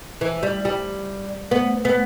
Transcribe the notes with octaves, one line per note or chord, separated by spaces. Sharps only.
E3
G3
G3
B3
B3